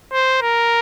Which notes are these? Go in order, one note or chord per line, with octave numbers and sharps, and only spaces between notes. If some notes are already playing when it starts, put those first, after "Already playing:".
C5
A#4